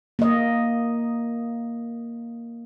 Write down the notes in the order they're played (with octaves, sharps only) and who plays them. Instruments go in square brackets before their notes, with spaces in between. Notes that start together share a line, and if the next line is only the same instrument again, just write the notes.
[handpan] A#3 D#5